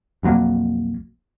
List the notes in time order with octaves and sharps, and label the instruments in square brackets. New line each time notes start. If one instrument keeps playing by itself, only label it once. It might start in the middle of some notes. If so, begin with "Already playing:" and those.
[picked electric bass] B1 F2 F#3 A#3